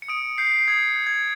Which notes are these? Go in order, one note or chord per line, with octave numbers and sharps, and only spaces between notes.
C#7
D#6 D7
G6 C7
D#6 G#6
G6
G#6